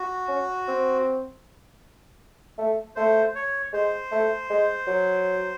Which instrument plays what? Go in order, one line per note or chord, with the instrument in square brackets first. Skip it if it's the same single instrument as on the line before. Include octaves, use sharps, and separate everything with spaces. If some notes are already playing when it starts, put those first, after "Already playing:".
Already playing: [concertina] F#4
[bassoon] C#4
C4
A3
[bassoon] A3 [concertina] C5
[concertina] C#5
[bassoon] G#3 [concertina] C5
[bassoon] A3
G#3
F#3